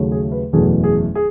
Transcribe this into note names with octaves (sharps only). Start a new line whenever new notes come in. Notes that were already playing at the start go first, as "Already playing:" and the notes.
Already playing: D#2 C#3 F#3 A3
G#4
B4
F#1 E2 B2 A3 G#4
G#4
G#4